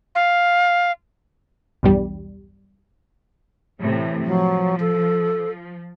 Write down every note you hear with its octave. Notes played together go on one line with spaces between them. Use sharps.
F5
B1 E2 G2 G3
A2 C3 E3
F3 F#3
A4